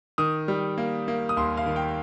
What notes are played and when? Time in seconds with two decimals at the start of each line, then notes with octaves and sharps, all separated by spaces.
0.18 D#3 D#6
0.48 G3
0.78 A#3
1.08 A#3
1.29 D#6
1.37 D#2 C6
1.57 F5
1.66 D#3
1.76 G5